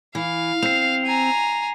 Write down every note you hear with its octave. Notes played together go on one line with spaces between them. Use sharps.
E3 F5
C4 C7 F7
G#5 A#5